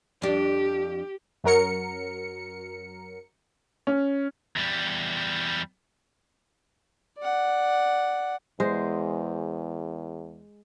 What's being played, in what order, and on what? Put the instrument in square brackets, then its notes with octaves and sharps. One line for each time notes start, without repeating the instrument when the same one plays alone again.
[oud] F2 D4 [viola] G4
[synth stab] F#2 F#3 A#4 C#7
[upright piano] C#4
[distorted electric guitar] E2 G3
[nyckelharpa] D5 F#5
[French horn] E2 [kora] G#3 C5